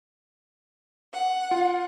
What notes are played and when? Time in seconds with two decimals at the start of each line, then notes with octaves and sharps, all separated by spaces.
1.13 F#5
1.51 F4